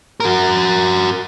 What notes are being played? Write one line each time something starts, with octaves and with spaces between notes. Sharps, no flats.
F#4 A#4